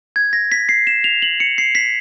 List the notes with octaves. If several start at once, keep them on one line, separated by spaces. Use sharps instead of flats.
G#6
A#6
B6
C7
E7
F7
F#7
C#7
C7
B6